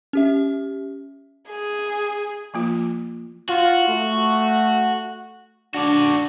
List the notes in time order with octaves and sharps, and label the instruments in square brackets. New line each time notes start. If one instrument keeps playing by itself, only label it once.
[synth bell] C#4 G4 E5
[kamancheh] G#4
[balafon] F3 A#3 F4
[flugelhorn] F4 [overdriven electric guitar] F#4
[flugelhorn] A3
[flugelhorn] D4 [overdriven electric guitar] F#4 D5